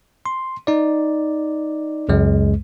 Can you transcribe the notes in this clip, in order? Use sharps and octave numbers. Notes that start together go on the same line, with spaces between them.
C6
D#4 D5
C#2 F#2 G#3